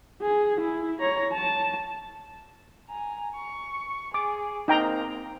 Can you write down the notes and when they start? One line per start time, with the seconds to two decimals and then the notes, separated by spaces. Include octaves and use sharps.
0.22 G#4
0.60 E4
1.00 C#5 A#5
1.33 A5
2.90 G#5 A#5
3.36 C#6
4.14 G#4 D6
4.68 A#3 C4 D#4 G5 A#5